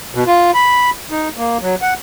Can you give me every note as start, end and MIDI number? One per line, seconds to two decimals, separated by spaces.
0.15 0.24 47
0.27 0.51 65
0.54 0.90 83
1.11 1.28 63
1.37 1.58 58
1.61 1.75 54
1.82 1.94 78